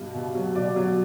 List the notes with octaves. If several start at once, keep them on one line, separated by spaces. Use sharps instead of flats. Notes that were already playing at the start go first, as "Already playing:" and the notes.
Already playing: G2 B2
B2
F#3
B2 D5
F#3